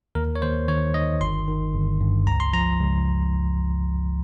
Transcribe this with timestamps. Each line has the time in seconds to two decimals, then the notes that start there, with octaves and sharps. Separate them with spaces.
0.15 D#2 A#4
0.36 C#5
0.42 D#2 C5
0.68 D#3 C#5
0.94 D#3 D#5
1.21 G1 C6
1.48 D#3
1.74 G1
2.01 G2
2.27 C#2 A#5
2.40 C6
2.53 F3 A#5
2.80 C#2